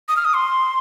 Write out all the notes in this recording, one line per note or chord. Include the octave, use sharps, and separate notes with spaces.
D#6
F6
D#6
C6